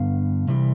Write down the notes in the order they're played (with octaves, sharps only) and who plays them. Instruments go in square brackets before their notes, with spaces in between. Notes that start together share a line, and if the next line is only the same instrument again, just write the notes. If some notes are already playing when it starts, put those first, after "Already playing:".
Already playing: [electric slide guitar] G2 D3 B3 F5
C3 E3 G3